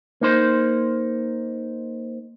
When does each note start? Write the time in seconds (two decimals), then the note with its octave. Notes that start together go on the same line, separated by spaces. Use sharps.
0.21 A#3 D#4 C5